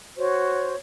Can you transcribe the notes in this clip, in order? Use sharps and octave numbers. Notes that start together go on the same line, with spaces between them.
F#4 C5 C#5